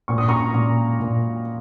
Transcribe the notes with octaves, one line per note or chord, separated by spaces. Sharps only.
A#2 C#6
D#6
A#5 C#6
A#2
A#2